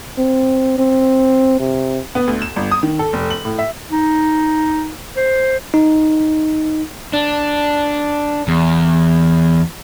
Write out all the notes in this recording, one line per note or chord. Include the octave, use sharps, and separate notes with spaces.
C4
C4
C3
B3
D2
E7
G1
D#6
D#3
A4
F1
F#7
A2
E5
D#4
C5
D#4
D4
E2